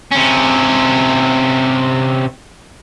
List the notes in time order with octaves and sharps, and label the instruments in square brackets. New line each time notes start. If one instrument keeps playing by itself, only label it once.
[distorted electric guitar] C3 C#4